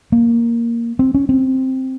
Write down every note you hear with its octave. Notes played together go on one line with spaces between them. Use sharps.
A#3
C4
C#4
C4